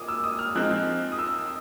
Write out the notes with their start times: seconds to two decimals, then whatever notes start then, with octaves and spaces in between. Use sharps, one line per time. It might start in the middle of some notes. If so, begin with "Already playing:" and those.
Already playing: A#2 D6 D#6
0.08 E6
0.24 D#6
0.39 F6
0.55 F3 G#3 C4 D#4 F#6
1.12 D#6
1.19 E6